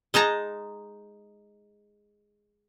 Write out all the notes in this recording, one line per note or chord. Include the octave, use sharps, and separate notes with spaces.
G#3 D#4 A5 A#5